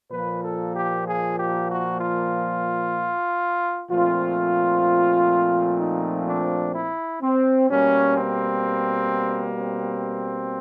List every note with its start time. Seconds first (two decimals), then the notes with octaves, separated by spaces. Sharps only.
0.11 A#2 F3 A#3 B4
0.43 A4
0.75 G4
1.05 G#4
1.38 G4
1.70 F#4
2.01 F4
3.90 A#2 F3 A3 C4 F4
5.80 D#4
6.26 D4
6.74 E4
7.21 C4
7.68 B2 G3 A#3 C#4
8.16 C4
9.58 C4